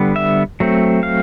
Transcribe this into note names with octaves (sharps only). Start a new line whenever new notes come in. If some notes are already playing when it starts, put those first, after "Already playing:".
Already playing: D3 G3 B3
E5
F#3 A3 C4
F5